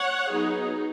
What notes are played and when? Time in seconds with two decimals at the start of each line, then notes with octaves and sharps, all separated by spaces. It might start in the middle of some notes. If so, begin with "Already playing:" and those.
Already playing: C#5 F#5
0.31 F#3 B3 D#4 G#4